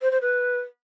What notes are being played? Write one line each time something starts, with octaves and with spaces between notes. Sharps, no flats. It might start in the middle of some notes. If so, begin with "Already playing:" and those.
C5
C5
B4